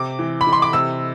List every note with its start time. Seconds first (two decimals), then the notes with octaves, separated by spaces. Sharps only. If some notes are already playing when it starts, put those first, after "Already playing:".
Already playing: C3 D6
0.19 E3
0.41 B5
0.47 E3
0.52 C6
0.62 D6
0.73 C3 E6